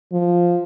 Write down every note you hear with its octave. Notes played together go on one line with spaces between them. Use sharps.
F3